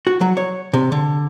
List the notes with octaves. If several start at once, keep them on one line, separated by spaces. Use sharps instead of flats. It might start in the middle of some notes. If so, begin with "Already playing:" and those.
F#4
F#3
C#5
C3
D3